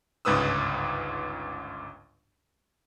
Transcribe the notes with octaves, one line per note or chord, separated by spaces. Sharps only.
G1 C#2 G#2 B4 D#6 E6